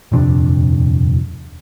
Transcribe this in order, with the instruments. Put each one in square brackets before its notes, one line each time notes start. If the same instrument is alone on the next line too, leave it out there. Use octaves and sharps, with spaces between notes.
[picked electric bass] D#1 F2 C3 D4